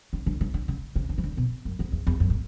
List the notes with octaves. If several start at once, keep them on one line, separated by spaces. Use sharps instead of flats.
D3
D3
D3
D3
C#3
C#3
D3
E3
D3
B2
F#2
E2
E2
E2
F#2
A2